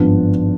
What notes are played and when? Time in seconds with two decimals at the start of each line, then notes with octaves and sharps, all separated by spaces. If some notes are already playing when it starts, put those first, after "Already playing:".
Already playing: G#1 G2 F3 B3 D4